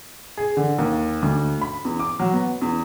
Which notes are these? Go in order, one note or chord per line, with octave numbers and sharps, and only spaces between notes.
G#4
D3
D#2
D2
B5
E2
D6
F#3
B3
E2